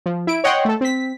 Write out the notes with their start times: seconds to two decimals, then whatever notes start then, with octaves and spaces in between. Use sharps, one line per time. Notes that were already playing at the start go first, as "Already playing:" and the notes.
0.06 F3
0.27 E4 D7
0.44 C#5 D#5 F#5 G5 C6
0.65 A3 A4
0.81 C4 B6